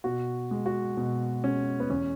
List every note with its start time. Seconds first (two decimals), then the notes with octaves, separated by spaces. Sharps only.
0.04 B2 F#4
0.51 G#3
0.66 F#4
0.97 B2
1.43 G#3 C#4
1.80 B3
1.90 E2 C#4